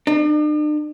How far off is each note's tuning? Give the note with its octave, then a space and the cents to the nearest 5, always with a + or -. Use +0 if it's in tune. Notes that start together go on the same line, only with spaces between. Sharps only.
D4 +45